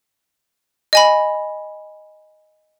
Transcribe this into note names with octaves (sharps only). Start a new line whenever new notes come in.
D#5 G#5 B5